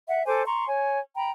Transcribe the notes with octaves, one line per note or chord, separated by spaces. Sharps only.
E5 F#5
A4 C5 G#5 D6
A#5 C6 C#6
C#5 G#5
G5 A#5 B5